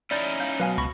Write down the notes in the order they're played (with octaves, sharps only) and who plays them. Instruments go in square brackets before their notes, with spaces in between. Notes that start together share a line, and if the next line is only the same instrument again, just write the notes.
[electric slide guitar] C#4 D#4 E4 [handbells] D5 G6 A6
[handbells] F5 G6
[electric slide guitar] B2 [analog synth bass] F#3 [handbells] B4 F5 G#5
[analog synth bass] C#2 [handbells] B5 C#6 A#6